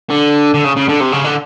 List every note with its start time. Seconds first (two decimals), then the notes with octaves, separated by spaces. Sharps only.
0.10 D3
0.54 D3
0.64 C#3
0.76 C#3
0.88 D3
1.00 C3
1.12 C#3
1.24 D3